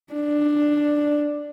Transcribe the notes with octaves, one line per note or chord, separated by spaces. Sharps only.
D4